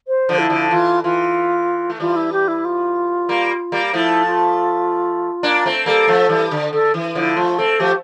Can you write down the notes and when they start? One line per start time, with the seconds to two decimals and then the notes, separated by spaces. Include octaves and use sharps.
0.08 C5
0.29 D3 F3
0.39 E4
0.50 D3 F3
0.71 E3 F4
1.03 E3 F4
1.90 A3
2.00 E3 G3 F4
2.16 E4
2.33 G4
2.48 E4
2.65 F4
3.29 G3 A#3
3.72 G3 A#3
3.93 F3 A3 E4
4.26 F4
5.43 A#3 D4
5.66 A3 C4
5.86 G3 A#3 A4
6.08 F3 A3
6.29 E3 G3
6.51 D3
6.73 D3 A4
6.94 E3
7.15 D3 F3 E4
7.36 F3 A3 F4
7.58 A3 C4 A4
7.80 F3 A3 G4